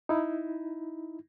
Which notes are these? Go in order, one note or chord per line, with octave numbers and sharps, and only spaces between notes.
D#4 E4